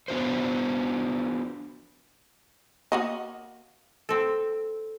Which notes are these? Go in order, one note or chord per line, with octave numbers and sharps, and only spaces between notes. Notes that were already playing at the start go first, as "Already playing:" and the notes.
B3 D4 F#4 C5
A#3 F#4 D#5
C4 A4